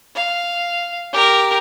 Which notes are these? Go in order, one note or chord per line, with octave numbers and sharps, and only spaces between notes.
F5
G4 A#4